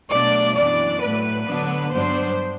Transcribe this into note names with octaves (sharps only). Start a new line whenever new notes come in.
B2 F#3 A3 D4 D5
F#2 E3 B3 D4 D5
A2 F#3 A3 B4
D3 F#3 B3 D4
G2 F#3 B3 D4 C5